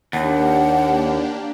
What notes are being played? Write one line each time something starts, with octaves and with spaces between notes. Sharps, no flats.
D#2 A#3 D4 G4 F#5